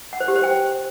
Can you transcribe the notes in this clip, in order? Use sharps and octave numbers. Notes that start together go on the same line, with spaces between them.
F#5
C5
G4
C5
G5